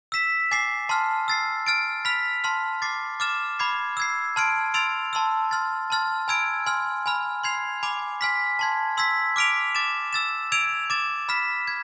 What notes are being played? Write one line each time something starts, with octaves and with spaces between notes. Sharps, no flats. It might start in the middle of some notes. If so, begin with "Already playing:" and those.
E6 B6 E7
G#5 D6 A6 C7
A5 C6 F6
E6 A6 C7
F6 A6 D7
B5 F6 B6 F7
A5 C6 F6
D6 A6 C7
D6 F6 A6 E7
B5 D6 G#6 C7
E6 G#6 C7
A5 C6 F6 G#6 D7
C6 E6 A6 D7 F7
A5 C6 E6
C6 F6 A6
A5 C6 F6 A6
G#5 B5 E6 G#6 D7
G#5 C6 F6
G#5 B5 F6
C6 G#6 C7 F7
G#5 B5 D6
G#5 C6 F6 B6
A5 C6 G#6
C6 E6 G#6 B6
D6 F6 B6 D7 F7
D6 A6 E7
E6 A6 E7
E6 G#6 D7 F7
D6 A6 E7
B5 F6 B6 E7
G#6